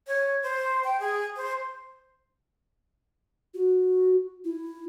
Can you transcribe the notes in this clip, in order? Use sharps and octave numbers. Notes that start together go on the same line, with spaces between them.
C#5
C5
G5
G#4
C5
F#4
E4